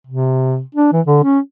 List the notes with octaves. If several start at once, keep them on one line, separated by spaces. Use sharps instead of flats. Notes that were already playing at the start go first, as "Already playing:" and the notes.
C3
D4
E3
D3
C#4